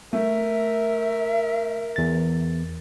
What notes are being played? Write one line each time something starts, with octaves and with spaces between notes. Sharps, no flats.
A3 A#4 E5
E2 A6